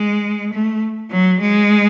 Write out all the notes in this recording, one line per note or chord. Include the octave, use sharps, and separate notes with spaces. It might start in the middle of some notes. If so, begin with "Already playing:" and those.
Already playing: G#3
A3
F#3
G#3